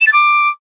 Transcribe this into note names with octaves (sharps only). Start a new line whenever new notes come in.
E7
A6
D6